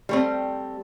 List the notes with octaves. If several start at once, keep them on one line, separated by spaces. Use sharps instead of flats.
G3 A3 C4